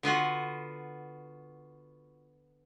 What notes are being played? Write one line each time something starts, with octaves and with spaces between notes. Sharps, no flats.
D3 B3 F4 F#4